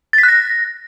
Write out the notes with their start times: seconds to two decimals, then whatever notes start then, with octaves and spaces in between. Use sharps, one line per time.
0.13 A6
0.18 B6
0.23 F#6
0.28 A#6